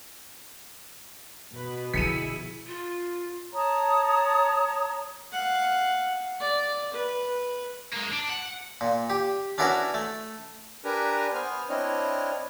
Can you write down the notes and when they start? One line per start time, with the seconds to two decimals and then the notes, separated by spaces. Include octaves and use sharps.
1.56 B2 B4
1.94 D3 F3 E4 G#4 B6 C#7 D#7
2.67 F4
3.54 C#5 A5 A#5 D#6
5.33 F5 F#5
6.41 D5
6.94 B4
7.93 G#3 A#3
8.12 D4
8.30 F#5
8.81 A#2
9.10 G4
9.58 C#4 D4 E4 F#4 A#4 B4
9.94 A3
10.85 D4 G4 A#4 B4 G#5 A#5
11.33 B3 C5 G#5 F6
11.69 C4 D4 E4 C#5 D#5 F6